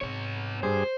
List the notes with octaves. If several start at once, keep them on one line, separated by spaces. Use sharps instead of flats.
G#2 C3 B3 C#5
G2 G#4 C5